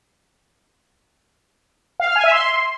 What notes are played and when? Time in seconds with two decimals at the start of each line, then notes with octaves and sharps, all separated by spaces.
2.00 F5
2.08 F6
2.16 G#5
2.24 E5
2.32 C6